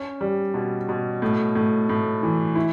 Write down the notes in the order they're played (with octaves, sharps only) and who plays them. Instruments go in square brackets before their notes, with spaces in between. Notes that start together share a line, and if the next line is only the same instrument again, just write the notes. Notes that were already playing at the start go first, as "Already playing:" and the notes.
Already playing: [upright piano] C#4
G3
B2
B2
A2
A2
A2
E3
E4